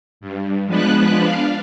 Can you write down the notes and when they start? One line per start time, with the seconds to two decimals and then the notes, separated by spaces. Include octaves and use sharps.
0.21 G2
0.67 F3 G#3 B3 D4 B4 F#6
1.23 D4 F5